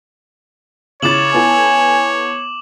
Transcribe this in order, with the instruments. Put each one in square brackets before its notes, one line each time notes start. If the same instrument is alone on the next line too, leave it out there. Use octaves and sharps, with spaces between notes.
[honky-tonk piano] C#3 E4 A6 [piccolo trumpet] C#5 [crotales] D6 E7 F#7
[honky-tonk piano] B3 E4 A4 [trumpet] G#5